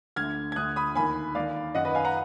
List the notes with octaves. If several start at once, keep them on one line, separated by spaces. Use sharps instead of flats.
D2 D3 F6 G#6
G#6
D2 D3 D#6 F#6
B5 D#6
D#2 D#3 G#5 B5
D#2 D#3 D5 F5
F#2 D#3 D#5 F#5
B4 D#5
F5 G#5
F#5 A#5